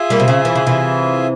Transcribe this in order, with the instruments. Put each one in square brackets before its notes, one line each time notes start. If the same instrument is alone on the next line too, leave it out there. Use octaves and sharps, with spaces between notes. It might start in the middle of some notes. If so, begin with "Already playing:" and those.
Already playing: [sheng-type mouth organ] F4 G#4 E5 G#5
[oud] G3 A#3
C3
C#3
E3
C#3
C3 E3